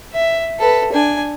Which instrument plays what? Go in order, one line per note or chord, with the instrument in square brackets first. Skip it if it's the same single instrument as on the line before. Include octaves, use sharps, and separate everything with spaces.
[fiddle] E5
A4 B4
D4 G#5